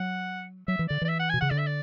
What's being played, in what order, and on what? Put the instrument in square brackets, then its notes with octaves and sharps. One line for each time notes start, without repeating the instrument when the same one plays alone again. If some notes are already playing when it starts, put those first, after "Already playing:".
Already playing: [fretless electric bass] F#3 [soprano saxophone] F#5
[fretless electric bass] F#3 [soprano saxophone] E5
[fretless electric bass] E3
[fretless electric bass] D3 [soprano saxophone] D5
[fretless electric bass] E3 [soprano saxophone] D5
[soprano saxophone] E5
F#5
G#5
[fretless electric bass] B2
[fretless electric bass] C#3 [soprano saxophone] F#5
[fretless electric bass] D3 [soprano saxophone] D5
[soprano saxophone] E5
D5